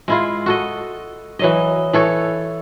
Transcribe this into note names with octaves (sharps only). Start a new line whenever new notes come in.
G#3 E4 F4
F#4 A4 D#5
E3 F#3 D#5
E3 A4 C#5